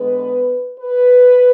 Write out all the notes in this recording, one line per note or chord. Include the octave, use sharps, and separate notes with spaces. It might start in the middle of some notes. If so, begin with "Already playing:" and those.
Already playing: D3 G#3 B3 B4
B4